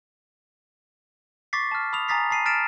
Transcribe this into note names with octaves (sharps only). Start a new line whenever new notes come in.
C#6 D6 A6 B6 C7
A5 F6
B5 D#6 F7
G#5 A#5 D#6 A6 B6 C7
A5 B5 C7 D#7
F6 A6 B6 D7 E7